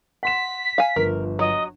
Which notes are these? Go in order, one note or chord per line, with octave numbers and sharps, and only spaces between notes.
F#5 C6 B6 E7
F5 G#5
G1 F3 A#4
F#3 D#5